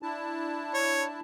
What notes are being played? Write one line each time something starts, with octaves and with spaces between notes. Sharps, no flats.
D4 E4 A5
C#5